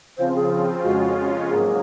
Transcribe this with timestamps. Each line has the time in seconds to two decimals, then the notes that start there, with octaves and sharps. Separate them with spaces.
0.18 C#3 F3 C4 F4 C5
0.35 G#4
0.83 F2 C#3 G#3 C#4 F4 F#4
1.48 G#2 F#3 A#3 G#4